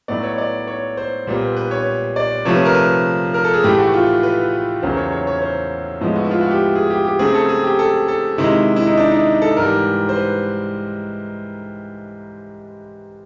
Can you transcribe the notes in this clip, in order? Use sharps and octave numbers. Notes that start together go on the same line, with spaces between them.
A2 F#3 B3 D5
C#5
D5
C#5
C5
A#2 G3 B3
B4
C#5
D5
C3 F3 A3 C#5
B4
A#4
B4
A#4
A4
G#4
A2 E3 A3 G4
F#4
F4
B4
E2 C#3 F#3 A#3 C5
C#5
C#5
C#5
C5
A2 F3 G#3 B3
F#4
E4
F4
F#4
G4
G#4
G4
G4
C#3 F#3 A3 C4 G#4
A4
G#4
G4
A4
A4
C3 D#3 G#3 E4
E4
D#4
D4
D#4
A4
G#2 E3 G3 A#4
C5
B4